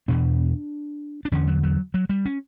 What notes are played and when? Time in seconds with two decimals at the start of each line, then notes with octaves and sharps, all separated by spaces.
0.08 E2 B2 D4
1.25 D4
1.32 E2 D3 C#4
1.47 F#3
1.63 F#3
1.94 F#3
2.09 G3
2.25 C#4